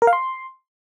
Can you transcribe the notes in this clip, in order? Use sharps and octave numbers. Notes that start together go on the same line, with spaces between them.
A#4
F5
C6